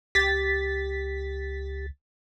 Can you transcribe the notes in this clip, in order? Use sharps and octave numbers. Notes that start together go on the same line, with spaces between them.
C#2 G4 A6 B6